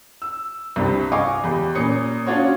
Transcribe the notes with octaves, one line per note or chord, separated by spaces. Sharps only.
E6
C2 G2 C3
D#5 F5 G#5 C#6 D6
E2 G4 B5
A#2 C#4 D#6 C#7
C#4 D4 F4 F#4 C#5